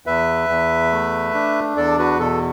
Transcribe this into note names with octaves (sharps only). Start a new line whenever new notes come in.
E2 B4 E5
E2
A3
D4
E2 A4 D5
F#4 B4
B2 A4